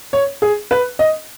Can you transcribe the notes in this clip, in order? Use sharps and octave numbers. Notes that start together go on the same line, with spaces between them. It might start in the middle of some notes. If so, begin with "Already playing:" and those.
C#5
G#4
B4
D#5